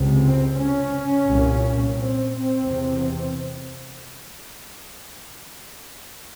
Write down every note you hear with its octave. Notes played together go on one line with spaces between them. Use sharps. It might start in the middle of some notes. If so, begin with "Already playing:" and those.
Already playing: C#2 C3
C4
C#4
C2 A#2
C4
C4
E2 C3